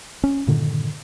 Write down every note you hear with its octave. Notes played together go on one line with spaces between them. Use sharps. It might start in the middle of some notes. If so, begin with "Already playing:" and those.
C#4
G2 A#2 D3 D#3